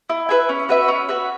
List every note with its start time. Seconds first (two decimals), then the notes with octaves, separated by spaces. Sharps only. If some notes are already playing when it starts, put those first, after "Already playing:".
0.10 E4
0.29 B4 E5 G#5
0.49 C#4
0.69 F#4 B4 E5
0.88 C#4
1.08 F#4 B4 E5